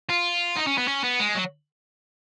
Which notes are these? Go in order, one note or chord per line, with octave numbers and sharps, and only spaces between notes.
F4
D#4
C#4
B3
C#4
B3
G#3
F#3